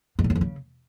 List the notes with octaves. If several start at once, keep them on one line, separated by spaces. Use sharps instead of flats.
G#2
A2
F#2
F2
C#3